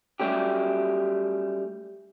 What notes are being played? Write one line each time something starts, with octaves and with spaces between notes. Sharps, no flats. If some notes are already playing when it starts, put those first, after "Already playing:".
F#3 G3 A3 C#4 G4